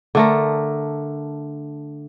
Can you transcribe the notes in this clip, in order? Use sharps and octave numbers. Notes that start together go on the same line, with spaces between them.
D3 A3 A#4